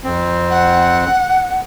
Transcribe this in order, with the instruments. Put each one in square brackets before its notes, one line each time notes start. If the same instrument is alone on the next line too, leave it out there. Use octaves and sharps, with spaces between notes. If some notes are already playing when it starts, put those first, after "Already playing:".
[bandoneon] F2 C4
[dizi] F#5